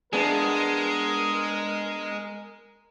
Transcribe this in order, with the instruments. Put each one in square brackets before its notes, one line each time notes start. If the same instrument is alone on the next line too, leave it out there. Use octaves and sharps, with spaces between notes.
[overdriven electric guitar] G#3 [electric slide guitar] B3 D4 G#4 [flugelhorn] A#4